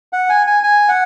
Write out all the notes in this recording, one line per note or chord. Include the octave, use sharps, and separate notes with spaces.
F#5
G#5
G#5
G#5
F#5